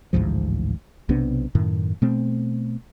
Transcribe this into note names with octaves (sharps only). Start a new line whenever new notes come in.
A1 D2 G#2 F3
B1 C3 B3 D4
F#2 A2 D#3
B2 A3 C4